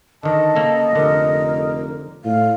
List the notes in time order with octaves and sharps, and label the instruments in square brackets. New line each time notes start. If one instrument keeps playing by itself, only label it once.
[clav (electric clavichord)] D3 D#3 [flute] D#5 [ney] A5
[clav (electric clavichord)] C#3 A#3 A4
[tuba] F1 [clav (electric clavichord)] D3 [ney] A#4
[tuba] A2 [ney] F5